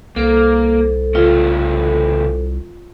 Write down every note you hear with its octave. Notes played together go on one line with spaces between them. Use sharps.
C2 A#3 A4 C5
C#3 A3 F4